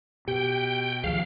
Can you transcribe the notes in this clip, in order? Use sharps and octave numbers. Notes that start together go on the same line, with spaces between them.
B2 G4 G5
D2 D#3 F3 G#4 F5